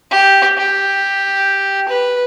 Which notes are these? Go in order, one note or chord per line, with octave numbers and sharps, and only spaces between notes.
G4
G4
B4